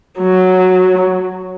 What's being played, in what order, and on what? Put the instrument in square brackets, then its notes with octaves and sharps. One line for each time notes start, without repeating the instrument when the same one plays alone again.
[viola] F#3